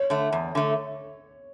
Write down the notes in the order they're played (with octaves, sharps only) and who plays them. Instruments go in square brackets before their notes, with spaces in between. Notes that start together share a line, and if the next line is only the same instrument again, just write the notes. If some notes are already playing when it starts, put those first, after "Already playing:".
Already playing: [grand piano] C#5
[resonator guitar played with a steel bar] D3 A3
E2
D3 A3